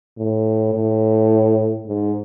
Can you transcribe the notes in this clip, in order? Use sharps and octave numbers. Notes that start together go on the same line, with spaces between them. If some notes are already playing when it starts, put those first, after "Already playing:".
A2
A2
G#2